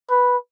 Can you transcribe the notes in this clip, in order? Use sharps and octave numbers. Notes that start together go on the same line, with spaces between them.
B4